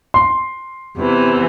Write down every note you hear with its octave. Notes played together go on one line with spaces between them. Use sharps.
C6
E2 C3 E3